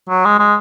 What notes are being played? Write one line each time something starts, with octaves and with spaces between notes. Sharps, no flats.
F#3
G#3
G#3